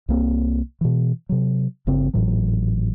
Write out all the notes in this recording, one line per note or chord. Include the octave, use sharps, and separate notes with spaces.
C2 A#3 C4
B2 E3
C3 F#3
G1 C#3 C4
G#1 A2 E3 F#3